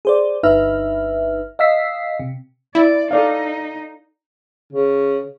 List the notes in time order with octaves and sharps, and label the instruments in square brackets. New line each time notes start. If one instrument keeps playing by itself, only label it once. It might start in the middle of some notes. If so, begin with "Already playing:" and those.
[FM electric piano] G#4 C5 D5
G1 D#4 B4 E5 F6
D#5 F5 E6 B6 C7
C3
[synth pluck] E4 [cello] D5
[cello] D#4 [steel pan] A4 D5 F5
[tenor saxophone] C#3